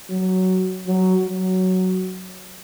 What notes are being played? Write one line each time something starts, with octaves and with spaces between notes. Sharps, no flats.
F#3
F#3
F#3